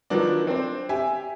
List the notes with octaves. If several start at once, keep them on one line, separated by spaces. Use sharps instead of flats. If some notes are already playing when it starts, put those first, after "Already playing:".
D#3 F3 F#3 B3 D4
C4 D4 C5
G4 E5 G#5